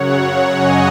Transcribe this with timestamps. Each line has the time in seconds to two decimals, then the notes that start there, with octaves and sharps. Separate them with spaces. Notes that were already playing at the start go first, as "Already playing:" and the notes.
Already playing: F#2 C#3 F#3 C#5 F#5
0.56 D#5 G#5